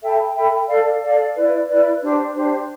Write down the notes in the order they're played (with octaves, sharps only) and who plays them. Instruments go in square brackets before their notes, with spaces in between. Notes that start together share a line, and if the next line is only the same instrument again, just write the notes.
[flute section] A4 E5 G5 B5
A4 E5 G5 B5
A4 D5 F5
A4 D5 F5
E4 B4 D5
E4 B4 D5
D4 G4 C5
D4 G4 C5